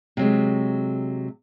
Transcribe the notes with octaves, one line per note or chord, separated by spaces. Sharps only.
C3 F#3 G#3